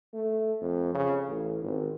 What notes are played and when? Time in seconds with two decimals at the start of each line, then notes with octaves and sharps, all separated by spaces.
0.14 A3
0.61 F2
0.95 C#3
1.28 A1
1.62 G#1